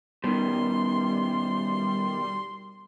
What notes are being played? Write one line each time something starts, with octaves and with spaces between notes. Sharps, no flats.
B2 D#3 G3 C6